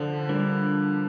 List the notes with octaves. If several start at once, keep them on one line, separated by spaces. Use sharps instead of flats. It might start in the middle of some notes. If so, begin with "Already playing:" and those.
Already playing: D3 F3
G3 D4 A#4